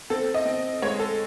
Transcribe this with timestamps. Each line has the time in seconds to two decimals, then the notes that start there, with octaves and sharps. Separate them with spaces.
0.10 C4 A4
0.34 D#5
0.46 C4
0.82 G#3 C#5
0.99 A4